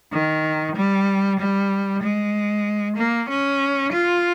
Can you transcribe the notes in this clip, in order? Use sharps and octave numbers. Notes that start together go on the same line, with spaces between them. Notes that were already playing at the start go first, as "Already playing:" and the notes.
D#3
G3
G3
G#3
A#3
C#4
F4